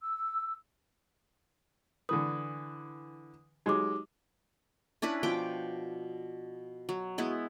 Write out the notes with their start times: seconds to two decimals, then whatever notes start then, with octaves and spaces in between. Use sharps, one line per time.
0.01 E6
2.09 D3 E3 B4 D#6
3.66 F#3 G#3 D#4 G4 D6
5.02 C#4 D4 E4 B4
5.23 B2 F3 G5 D6
6.89 F#3
7.18 G#3 B3 E4